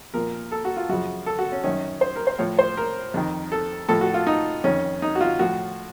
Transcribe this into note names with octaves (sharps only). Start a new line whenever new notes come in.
A#2 F3 A#4
A4
F#4
F4
F#2 C#3 F3 F#4
A4
F#4
C#4
F#2 D#3 C#4
C5
A#4
C5
A2 F3 C#5
C5
A#4
F2 D#3
A4
A2 F3 A4
F#4
F4
D#4
F2 D#3 C#4
D#4
F#4
F4
A2 F3 F#4